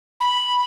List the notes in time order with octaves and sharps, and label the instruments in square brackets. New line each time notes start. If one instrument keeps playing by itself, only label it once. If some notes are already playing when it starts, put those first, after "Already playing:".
[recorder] B5